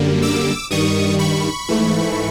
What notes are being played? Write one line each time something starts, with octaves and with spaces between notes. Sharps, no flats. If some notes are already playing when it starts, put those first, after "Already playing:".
Already playing: F#2 D3 G3 A#3
D6 E6
G2 D#3 G3 C#6 D#6
B5 C#6
G#2 E3 A3